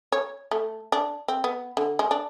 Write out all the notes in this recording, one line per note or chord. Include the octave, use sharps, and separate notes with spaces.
C#5
A3
D4
C4
B3
D3
G#3
D4